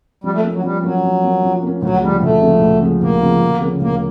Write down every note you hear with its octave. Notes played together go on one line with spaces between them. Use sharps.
F3 G3
A3
A#3 C#4
F#3
F3 G3
F#3 A#3 C#4
F3
A#3 C#4
F3
A#3 C#4
D2 F#3
C#3 F3 G3 G#3
D2 A3
C#3 F3 G#3
D2
C#3 F3 G#3
D2 A#3
C#3 F3 G#3
D2
C#3 F3 A#3 C#4
D2 A#3